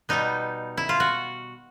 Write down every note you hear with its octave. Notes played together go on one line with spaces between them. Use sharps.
B2 G3 B3 D#4
E4
F4
F#4